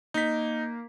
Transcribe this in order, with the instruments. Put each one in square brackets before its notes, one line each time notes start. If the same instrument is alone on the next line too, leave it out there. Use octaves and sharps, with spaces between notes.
[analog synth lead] A#3 [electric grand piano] D#4 B6